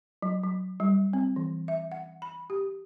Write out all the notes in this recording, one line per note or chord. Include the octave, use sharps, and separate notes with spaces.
F#3
F#3
G3
C4
E3
E5
F#5
B5
G4